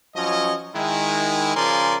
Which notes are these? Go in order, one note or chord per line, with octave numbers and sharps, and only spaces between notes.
F3 F#3 C#4 C#5 D#5
D#3 G#3 E4
C#3 F3 A#4 D5 G#5 C6